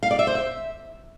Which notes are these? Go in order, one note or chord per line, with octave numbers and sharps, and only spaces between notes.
F5
D5
E5
C5
E5